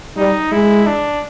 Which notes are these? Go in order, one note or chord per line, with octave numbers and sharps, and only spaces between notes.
G3 D#4
G#3 E4
D4